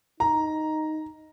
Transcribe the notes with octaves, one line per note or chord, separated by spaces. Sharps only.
D#4 A#5